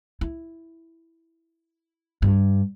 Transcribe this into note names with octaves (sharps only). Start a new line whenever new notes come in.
E4
G2